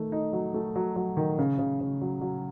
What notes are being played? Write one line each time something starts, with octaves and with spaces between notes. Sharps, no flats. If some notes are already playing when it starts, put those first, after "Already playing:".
Already playing: D#3 A3
D#4
F#3
A3
F#3
F#3
D#3
C#3
C#3
C#3
F#3
F#3